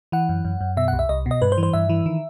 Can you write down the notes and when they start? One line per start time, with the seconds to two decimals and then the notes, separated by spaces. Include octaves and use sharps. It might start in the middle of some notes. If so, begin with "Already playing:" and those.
0.12 E3 F#5
0.29 F#2
0.45 F#2
0.61 F#2
0.77 B2 E5
0.88 F#5
0.93 C2
0.99 E5
1.09 C2 D#5
1.26 B2
1.31 D#5
1.42 G2 B4
1.52 C5
1.58 E3
1.63 C5
1.73 G2 E5
1.89 E3
2.06 D#3